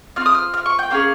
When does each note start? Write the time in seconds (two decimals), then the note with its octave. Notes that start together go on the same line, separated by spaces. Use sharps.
0.16 C4 F4 F6
0.26 D#6
0.35 F6
0.54 F6
0.66 C#6
0.79 G5
0.90 A#3 C#4 G#4 F5